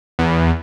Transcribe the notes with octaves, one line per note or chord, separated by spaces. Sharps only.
E2